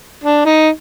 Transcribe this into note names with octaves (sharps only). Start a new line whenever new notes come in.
D4
D#4